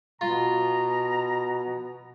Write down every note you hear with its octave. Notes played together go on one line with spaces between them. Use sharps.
B2 F4 A#5